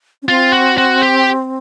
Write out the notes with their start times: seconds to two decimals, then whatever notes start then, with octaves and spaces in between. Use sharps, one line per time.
0.23 C#4
0.28 C4 F4
0.53 F#4
0.78 F#4
1.03 G4